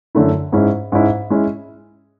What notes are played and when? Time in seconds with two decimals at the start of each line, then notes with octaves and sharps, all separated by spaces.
0.15 F#2 D3 A3 E4
0.52 G#2 G#3 C#4 E4
0.92 G#2 G#3 C#4 E4
1.30 G#3 C#4 E4